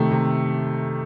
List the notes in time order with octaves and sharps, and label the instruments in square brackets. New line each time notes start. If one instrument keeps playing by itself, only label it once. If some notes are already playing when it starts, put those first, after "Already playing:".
Already playing: [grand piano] C3 D#3 A3
C3